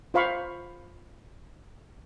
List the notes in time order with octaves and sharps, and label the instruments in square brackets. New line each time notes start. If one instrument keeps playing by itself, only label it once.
[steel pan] F4 C5 F5 B5 C#6